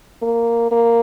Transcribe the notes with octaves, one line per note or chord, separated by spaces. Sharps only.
A#3
A#3